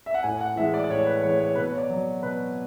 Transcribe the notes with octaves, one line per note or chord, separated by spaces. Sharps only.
E5
F#5
A2 G#5
F#5
E3 G#3 E5
D5
D5
A2 C#5
B4
E3 G#3 C#5
C#5
B2 B4
C#5
D5
F#3
B2 B4